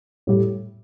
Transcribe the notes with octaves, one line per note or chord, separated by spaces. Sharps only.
A2 G3